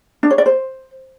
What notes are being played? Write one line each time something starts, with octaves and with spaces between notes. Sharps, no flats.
D4
C#5
D5
C5